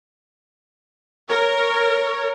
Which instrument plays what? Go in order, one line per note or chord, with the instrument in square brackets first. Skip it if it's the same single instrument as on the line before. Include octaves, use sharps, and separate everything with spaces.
[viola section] A#4 [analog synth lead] C#5